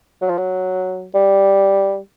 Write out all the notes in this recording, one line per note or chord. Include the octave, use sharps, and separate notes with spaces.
F#3
F3
F#3
G3